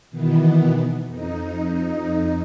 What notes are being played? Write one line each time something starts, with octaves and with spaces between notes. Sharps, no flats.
B2 D#3 E3 B3
F2 D#4